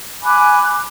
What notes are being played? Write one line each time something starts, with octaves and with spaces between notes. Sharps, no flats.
G#5 B5 D6 F#6